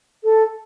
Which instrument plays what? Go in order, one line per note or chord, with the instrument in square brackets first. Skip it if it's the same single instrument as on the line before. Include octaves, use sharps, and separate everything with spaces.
[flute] A4